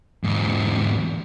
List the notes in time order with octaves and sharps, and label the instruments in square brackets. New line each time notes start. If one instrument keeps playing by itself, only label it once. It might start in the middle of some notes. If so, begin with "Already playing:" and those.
[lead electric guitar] E2 G#2